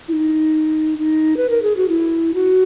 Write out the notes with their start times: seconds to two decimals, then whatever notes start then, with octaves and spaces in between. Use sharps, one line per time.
0.08 E4
0.13 D#4
0.98 D#4
1.37 B4
1.50 A#4
1.62 G#4
1.77 F#4
1.89 E4
2.34 F#4